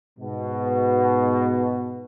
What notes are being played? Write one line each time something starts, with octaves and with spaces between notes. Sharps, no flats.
G#2 B2